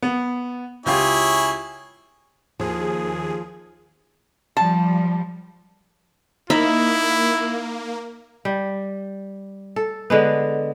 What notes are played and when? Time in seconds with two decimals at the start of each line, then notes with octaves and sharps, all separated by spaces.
0.02 B3
0.86 C#2 E4 F4 G4 G#4 C#5
2.59 D#2 F3 G#4
4.57 F3 G3 A5
6.50 A#3 D#4 E4 E5 B5
8.45 G3
9.76 A4
10.10 D3 G#3 B3